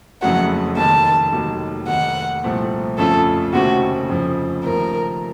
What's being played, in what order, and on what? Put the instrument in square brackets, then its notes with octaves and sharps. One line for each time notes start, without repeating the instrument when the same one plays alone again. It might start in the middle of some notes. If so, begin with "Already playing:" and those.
[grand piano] F#1 F2 C#3 F#3 A3 [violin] F#5
[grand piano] F1 D#2 D#3 [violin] A5
[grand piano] F1 D#2 D#3 F#3
[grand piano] F1 D#2 D#3 [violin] F#5
[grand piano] C2 A#2 F3 A3 C4
[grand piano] F2 C#3 A3 C#4 F4 [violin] A4
[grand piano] F1 D#2 C#3 A3 C4 [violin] F#4
[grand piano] F1 F2 C#3 F3
[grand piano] D#2 C#3 F3 A3 [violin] A#4